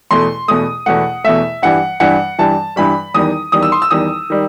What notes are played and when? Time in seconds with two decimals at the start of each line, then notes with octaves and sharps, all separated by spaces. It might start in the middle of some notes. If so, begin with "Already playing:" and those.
0.11 E2 B2 A3 C6
0.48 E2 B2 A3 D#6
0.86 E2 B2 A3 F#5
1.24 E2 B2 A3 E5
1.62 G2 E3 G3 F#5
2.00 G2 E3 G3 F#5
2.39 G2 E3 G3 A5
2.76 G2 E3 G3 B5
3.14 E2 D#3 G3 D#6
3.52 E2 D#3 G3 D#6
3.63 E6
3.72 C6
3.82 E6
3.91 E2 D#3 G3 D#6
4.30 D#3 G3